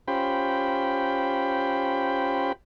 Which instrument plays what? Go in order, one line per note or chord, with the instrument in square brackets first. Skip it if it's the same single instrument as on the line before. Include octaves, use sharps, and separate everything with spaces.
[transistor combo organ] C#4 F4 G4 C5 G5 B5